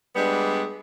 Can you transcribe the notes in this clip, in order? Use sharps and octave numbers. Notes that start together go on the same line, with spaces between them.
G3 G#3 B3 D4